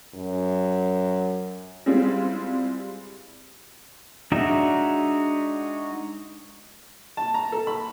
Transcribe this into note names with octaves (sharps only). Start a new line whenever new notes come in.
F#2
G3 G#3 C4 E4 F4
G#3 D4 D#4 F#4 E5
A5
A#5
A4
B5